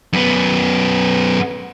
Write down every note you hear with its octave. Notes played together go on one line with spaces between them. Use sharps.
F#2 B3